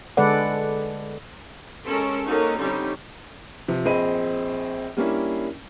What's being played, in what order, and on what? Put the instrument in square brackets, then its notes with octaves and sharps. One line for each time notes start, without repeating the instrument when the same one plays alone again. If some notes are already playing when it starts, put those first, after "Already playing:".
[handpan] D3 G#3 A4 B4 D5 F#5
[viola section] G#3 C#4 A4 A#4
A#3 C#4 D#4 F#4 A4 A#4
D3 G3 C4 C#4 D#4 G4
[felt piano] C3 F3
A#1 C4 G#4 D#5 B5 D#7
G3 A#3 C#4 D4 E4